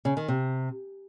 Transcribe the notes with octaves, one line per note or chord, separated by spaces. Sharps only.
C#3
D#3
C3